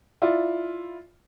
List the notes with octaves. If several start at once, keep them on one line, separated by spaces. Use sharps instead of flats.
E4 F4 D5